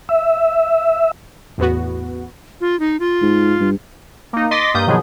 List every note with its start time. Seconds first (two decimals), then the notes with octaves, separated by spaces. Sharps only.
0.09 E5
1.58 A1 E2 B3 F#4
2.61 F4
2.80 D#4
3.00 F4
3.22 G#2
3.60 G2
4.33 A#3 D#4
4.51 D#5 C6 D6 A6 B6
4.74 G2 A#3 D#6 G6
4.87 B2 D#3 F3 F#3 B3 G#4